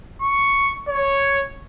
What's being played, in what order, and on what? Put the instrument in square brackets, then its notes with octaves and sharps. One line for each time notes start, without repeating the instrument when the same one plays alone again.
[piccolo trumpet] C#6
C#5